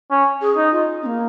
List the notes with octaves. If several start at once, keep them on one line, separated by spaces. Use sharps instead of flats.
C#4
G#4
D#4
F4
C#4
A#3